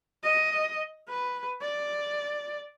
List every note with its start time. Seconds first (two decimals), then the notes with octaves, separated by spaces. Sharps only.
0.23 D#5
1.08 B4
1.62 D5